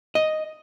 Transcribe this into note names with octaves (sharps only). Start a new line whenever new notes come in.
D#5